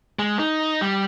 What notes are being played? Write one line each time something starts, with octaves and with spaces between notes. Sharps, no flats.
G#3
D#4
G3